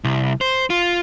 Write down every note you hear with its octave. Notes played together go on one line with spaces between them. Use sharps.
C2
C5
F4